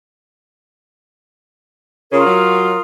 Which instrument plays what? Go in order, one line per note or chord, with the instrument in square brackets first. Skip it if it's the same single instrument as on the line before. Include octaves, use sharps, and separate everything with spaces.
[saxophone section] C#3 C#4 [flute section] F4 A#4 D#6
[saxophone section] F#3